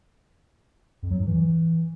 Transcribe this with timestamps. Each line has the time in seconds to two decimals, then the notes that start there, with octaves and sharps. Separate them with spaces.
1.03 F2
1.11 F#3
1.18 G#2
1.26 E3